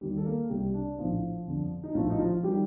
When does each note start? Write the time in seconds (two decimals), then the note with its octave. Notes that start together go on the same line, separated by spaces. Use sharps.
0.01 D#2 D#3 G3
0.17 A4
0.25 A#3 A#4
0.49 C2 C3 G3 G4
0.74 D4
0.98 A#1 A2 F3 A3 F4
1.47 G1 F2 D3
1.83 D#4
1.94 A#1 A2 F3 A3 F4
2.10 D#4
2.19 F3 F4
2.43 D#3 G3 G4